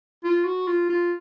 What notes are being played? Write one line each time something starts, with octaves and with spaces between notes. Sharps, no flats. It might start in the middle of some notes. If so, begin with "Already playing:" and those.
F4
F#4
F4
F4